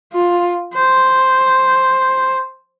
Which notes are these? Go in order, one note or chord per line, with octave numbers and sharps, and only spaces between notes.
F4
C5